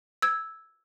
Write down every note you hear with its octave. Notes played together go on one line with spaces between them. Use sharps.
E6 G#6